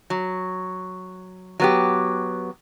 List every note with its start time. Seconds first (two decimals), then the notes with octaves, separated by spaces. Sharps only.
0.10 F#3
1.60 F#3 B3 G4